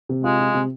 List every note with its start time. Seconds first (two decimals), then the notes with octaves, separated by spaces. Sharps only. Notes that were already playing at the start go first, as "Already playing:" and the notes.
0.09 C3
0.24 G#3 F4
0.40 F4
0.54 C3